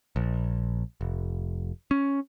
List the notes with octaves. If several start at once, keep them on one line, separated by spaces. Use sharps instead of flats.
A#1
F1
C#4